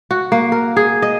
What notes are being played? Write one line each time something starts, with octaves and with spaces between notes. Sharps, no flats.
F#4
A#3
A#4
G#4
D#5